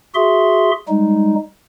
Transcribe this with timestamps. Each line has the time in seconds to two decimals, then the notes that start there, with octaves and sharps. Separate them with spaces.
0.15 F#4 G#4 E5 C6
0.88 G3 G#3 D#4